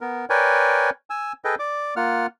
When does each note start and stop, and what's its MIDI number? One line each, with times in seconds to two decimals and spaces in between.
0.01 0.25 59
0.01 0.25 70
0.30 0.90 70
0.30 0.90 71
0.30 0.90 73
0.30 0.90 74
0.30 0.90 79
0.30 0.90 80
1.10 1.33 80
1.10 1.33 88
1.45 1.55 68
1.45 1.55 69
1.45 1.55 71
1.45 1.55 75
1.45 1.55 79
1.59 1.94 74
1.59 1.94 86
1.96 2.27 58
1.96 2.27 65
1.96 2.27 78
1.96 2.27 89